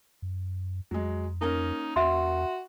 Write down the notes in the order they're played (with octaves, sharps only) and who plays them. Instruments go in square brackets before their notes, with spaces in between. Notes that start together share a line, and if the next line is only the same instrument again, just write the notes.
[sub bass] F#2
[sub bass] F2 [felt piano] F#3 G#3
[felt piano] A#3 C#4 A#4 [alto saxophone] D#4
[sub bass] E2 [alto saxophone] F#4 [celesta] E5 C6